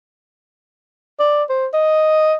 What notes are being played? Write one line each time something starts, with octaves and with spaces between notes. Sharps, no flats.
D5
C5
D#5